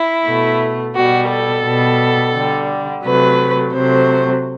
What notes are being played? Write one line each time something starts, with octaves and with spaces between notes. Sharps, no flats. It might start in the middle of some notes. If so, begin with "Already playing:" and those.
Already playing: E4
B2 A3
B2 G3 F#4
A4
B2 G3
D3 G3
C3 F#3 A3 B4
C3 F#3 A3 C5